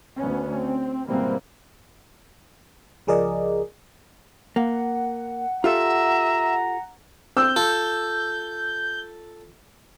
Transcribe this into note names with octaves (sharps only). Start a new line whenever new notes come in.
D2 B3 C#4
C4
G#1 B2 E3 G3 A#3 C4
C#2 F3 G#4 A#4 D5 D#5
A#3 F#5
F4 G4 A4 E5 A#5
C4 E6 G6
F4 A4